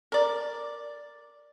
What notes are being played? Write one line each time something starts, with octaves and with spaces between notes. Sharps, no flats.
A#4 D5